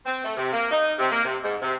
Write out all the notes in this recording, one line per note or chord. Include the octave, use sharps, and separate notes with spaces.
C4
A3
C3
A#3
D#4
C3
A#3
C3
G#2
C3